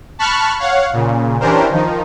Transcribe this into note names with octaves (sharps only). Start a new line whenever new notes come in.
A5 B5 C#6 F6 F#6
C#5 F5 F#5
A#2 C#3
E3 C#4 D4 G4 A#4 C5
D#3 F3 D#4